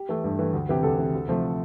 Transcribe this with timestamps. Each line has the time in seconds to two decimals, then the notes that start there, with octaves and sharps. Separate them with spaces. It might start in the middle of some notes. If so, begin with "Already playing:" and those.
Already playing: G4
0.09 E3 A3
0.24 G2
0.39 E3 A3
0.54 D2
0.69 C3 E3 G4
0.83 D2 A4
0.98 C3 E3
1.14 D2
1.28 C3 F3 A3